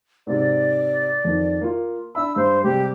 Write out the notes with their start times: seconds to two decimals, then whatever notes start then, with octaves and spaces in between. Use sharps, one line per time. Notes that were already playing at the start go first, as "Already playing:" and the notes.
0.27 G#2 C3 D5
1.25 F2 D#3
1.61 A#3 F4
2.15 D4 E5 B5 E6
2.36 G2 C5
2.63 C3 G3 G#3 G4